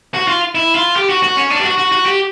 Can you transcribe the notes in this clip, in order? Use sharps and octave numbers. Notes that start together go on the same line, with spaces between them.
F#4
F4
E4
F4
G4
F#4
F#4
C#4
D4
G4
F#4
F#4
F#4
G4